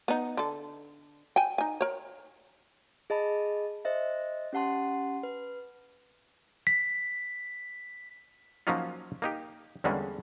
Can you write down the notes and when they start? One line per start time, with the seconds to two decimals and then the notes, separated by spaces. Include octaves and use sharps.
0.08 B3 D#4
0.37 D3 A4
1.36 G5 G#5
1.58 D#4 G#5
1.81 A#4 C#5
3.10 G#4 D#5 A5 B5
3.85 C5 D#5 E5
4.53 C#4 G4 F#5 A5 C6
5.23 B4
6.67 B6
8.67 F3 F#3 A#3 C#4 D#4 F4
9.22 A#3 D#4 G4
9.84 E2 D3 G3 G#3 A#3 C#4